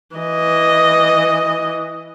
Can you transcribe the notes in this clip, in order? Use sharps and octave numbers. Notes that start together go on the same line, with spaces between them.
E3 D#5